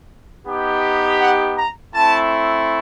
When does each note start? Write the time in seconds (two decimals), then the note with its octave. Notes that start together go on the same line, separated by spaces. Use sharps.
0.47 B3 D#4 G4
1.20 F#5
1.57 A#5
1.94 A3 C4 E4 A5